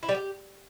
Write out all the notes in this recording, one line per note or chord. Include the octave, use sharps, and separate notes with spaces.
E4
G3
G4